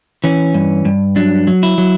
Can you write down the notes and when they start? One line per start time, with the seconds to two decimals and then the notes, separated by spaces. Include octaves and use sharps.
0.24 E3 C#4
0.54 G2
0.85 G2
1.16 F#3 D4
1.47 F#3
1.63 E4
1.78 F#3